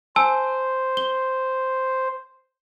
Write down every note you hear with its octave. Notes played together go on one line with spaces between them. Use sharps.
C5 G#5 A5 E6
G7